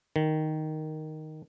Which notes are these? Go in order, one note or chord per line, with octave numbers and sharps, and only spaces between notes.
D#3